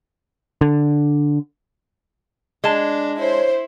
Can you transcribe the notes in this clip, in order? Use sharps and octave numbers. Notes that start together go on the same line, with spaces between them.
D3
G#3 D4 A5
E4 C5 C#5